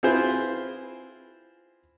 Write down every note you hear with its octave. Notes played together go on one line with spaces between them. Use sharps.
C4 E4 F4 G#4 B4 C5